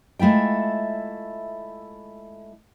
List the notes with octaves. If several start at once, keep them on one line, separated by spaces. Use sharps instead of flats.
G#3 A3 E4 F4 G5